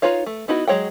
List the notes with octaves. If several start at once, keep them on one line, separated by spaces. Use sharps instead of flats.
D#4 F4 B4 C#5 F5
A3
B3 D#4 E4 F#4
F#3 G#3 C#5 F#5 G5